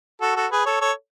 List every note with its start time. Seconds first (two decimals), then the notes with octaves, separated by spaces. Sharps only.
0.21 F#4 A4
0.36 F#4 A4
0.52 G#4 B4
0.66 A4 C#5
0.81 A4 C#5